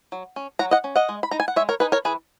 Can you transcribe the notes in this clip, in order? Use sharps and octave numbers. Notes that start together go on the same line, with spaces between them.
F#3
C#4
F#3 F#5 A#5
D#5 F#5
C#4
D#5 F#5
G#3
B5
D#4 A#5
G#5
F#5
G#3 C#5 E5
A#4 C#5
D#4 G#4 B4
A#4 C#5
E3 G#4 B4